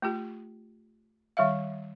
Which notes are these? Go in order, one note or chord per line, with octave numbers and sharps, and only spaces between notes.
A3 F4 G4
D#3 G3 E5 F5